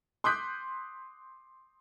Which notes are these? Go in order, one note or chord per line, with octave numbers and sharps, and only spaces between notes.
C6 D6 D#6 F#6 G6 B6